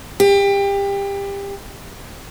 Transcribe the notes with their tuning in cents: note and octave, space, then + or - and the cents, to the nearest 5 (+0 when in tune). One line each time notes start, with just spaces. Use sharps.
G4 +25